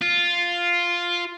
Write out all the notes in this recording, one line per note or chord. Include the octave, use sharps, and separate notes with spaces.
F4